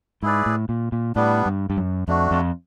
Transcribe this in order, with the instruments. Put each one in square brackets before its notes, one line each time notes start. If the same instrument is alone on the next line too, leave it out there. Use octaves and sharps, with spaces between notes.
[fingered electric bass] G#2 [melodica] E4 G#4 B4 D5
[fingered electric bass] A2
A#2
A#2
[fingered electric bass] A2 [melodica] G3 B3 D4
[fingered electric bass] G2
G2
F#2
[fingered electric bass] F2 [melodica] A3 D4 F#4
[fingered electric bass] F2